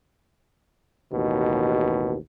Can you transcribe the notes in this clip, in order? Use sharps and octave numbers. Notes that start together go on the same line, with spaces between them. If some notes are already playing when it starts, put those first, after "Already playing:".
A1 D#2 B2